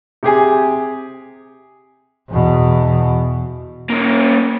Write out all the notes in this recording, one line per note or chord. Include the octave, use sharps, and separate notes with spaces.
C3 G4 G#4 G#5
E2 B2
A#3 C#4